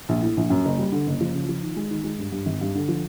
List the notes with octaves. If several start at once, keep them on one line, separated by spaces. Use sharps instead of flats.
A#1
A2
A#1
F#2
F#1
G3
D3
F#1
F3
C#3
F3
D#3
G#3
D#3
G#3
G2
G2
G#1
G2
D3
F3